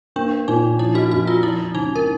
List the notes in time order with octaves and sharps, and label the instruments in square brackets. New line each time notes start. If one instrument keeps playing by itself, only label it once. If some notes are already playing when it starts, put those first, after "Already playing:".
[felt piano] A#3 [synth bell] D4
[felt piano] A#2 [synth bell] D#4
[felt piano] F3 [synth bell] E4
[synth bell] F#4
[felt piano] F2 [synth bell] F#4
[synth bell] F4
[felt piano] F3 [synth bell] E4
[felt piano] C#2 [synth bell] D#4
[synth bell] A#4